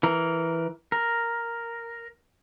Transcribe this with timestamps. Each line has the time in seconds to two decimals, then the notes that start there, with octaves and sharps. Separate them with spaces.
0.03 E3 A#4
0.92 A#4